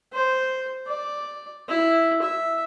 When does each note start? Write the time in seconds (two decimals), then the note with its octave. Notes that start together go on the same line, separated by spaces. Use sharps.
0.14 C5
0.87 D5
1.69 E4
2.22 E5